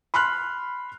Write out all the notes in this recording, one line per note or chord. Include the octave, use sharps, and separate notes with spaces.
B5 C6 F6 F#6